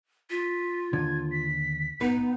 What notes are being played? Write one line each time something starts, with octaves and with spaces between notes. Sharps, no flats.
F4 B6
D#2 D3 G#6
B6
B3 D#4 B4